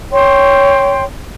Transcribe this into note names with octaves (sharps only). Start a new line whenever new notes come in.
C#5 G5 C6